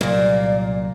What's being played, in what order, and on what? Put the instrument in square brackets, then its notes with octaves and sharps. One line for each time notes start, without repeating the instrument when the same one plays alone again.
[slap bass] C2 F#3 G3 [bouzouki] A#2 A#3 [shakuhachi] D5